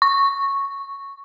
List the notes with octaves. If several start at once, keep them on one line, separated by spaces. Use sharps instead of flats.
C#6